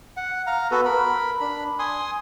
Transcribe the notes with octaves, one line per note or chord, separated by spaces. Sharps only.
F#5
F5 A#5
B3 F#4 A4 B4
A#4 B5
D4 B5
G#5 C6 D#6